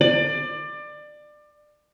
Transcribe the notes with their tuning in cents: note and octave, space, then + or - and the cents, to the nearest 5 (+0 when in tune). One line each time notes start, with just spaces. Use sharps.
D5 +25